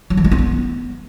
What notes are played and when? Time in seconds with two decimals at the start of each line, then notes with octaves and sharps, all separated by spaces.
0.10 F#3
0.17 E3
0.24 G#3
0.31 C4
0.38 B3